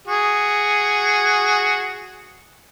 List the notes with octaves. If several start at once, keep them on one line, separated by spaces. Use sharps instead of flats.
F#4 G#4